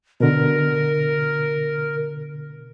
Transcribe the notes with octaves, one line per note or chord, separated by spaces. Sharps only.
B2 D3 A#4